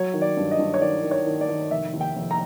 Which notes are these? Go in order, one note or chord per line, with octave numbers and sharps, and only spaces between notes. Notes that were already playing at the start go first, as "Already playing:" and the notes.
Already playing: F#3 C#5
D#3
D5
G2
D#5
G2
C#5
D#3 D5
D#3
C#5
D#3
D5
D#3
F1 E5
D#2
G5
F1
A#5